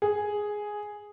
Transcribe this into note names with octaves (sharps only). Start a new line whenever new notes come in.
G#4